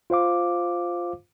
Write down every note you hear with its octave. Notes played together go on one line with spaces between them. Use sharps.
F4 C5 F5 D6